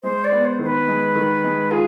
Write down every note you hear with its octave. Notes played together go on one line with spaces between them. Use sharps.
G#3 C5
D5
B3
C5
D#3 C5
B4
G#3
D#3
G#3
F4 G#4